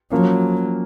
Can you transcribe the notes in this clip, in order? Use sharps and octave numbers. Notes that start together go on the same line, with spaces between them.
F3 F#3 A#3 C#4